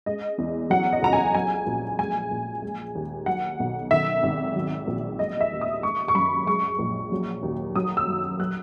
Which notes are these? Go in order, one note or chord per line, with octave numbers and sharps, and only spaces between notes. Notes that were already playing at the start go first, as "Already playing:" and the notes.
G#3 D#5
E2
F#3 F#5
D#5
C#2 A#5
G#5
F#3 G#5
A#1
G#3 G#5
A#1
G#3
D#2
F#3 F#5
B1
D#3 E5
G#1
F#3
A#1
G#3 D#5
E5
D#2
D#6
G#3 C#6
C#6
F#2 B5
G#3 C#6
A#1
F#3
D#2
F#3 D#6
E6
F#2
F#3 F#6